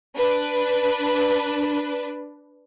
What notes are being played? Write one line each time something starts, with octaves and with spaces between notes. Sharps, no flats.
D4 B4